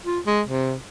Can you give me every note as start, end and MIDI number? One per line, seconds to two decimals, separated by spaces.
0.06 0.20 65
0.27 0.42 56
0.48 0.74 48